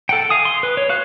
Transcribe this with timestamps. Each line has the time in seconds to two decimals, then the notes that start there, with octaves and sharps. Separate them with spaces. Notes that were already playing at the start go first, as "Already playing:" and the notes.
0.09 A4 F#5 G5
0.30 F5 G#5 D#6
0.45 C6
0.63 B4
0.77 C#5
0.89 F#4 F5 F#6